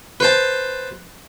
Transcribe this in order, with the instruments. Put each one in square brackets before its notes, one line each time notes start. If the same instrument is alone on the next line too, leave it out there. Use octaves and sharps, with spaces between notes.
[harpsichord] B4 C5 A5